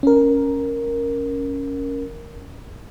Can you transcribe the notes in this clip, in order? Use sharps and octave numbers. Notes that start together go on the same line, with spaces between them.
C#4 A#4